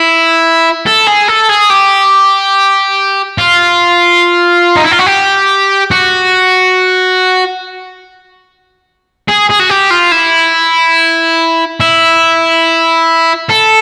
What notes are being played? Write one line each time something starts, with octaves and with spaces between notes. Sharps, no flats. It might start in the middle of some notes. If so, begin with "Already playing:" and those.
Already playing: E4
A4
G#4
A4
G#4
G4
F4
D#4
E4
F4
F#4
G4
F#4
G#4
G#4
F#4
G4
F4
E4
E4
A4